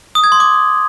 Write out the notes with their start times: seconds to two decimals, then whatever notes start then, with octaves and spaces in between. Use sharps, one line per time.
0.15 D#6
0.24 G#6
0.32 C6
0.40 D6